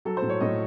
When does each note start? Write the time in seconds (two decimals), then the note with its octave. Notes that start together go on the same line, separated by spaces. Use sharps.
0.05 F#3 A4
0.17 C5
0.22 A2
0.29 C#5
0.40 A2 D#5